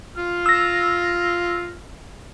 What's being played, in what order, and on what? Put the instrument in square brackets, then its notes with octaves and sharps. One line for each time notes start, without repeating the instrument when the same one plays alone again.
[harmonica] F4 F6
[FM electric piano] E6 A#6